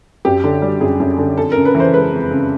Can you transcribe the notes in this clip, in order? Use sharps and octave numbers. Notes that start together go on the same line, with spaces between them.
F#2 G4
D3
G3
F#2 G#4
F#2
D3
F2 A4
C#3 A#4
B4
E3
C5
G#3 B4
F2
C#3